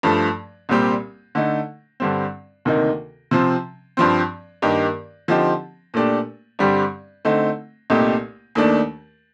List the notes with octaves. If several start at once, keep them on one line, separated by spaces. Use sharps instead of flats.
G2 F3 A3
C2 A#2 G3 C4 G4
D3 A3 D#4
G2 D3 G3 C4
D2 C3 D#3 A#3 D#4
C3 F3 C4
G2 F3 C4
G2 D#3 A#3 D#4 G4
D3 F3 C4 D#4 G4
A#2 A3 D4 G4
G2 D3 G3 C4 G4
D3 A3 C4 D#4
C2 A#2 A3 D#4 G4
D#2 D#3 A3 D4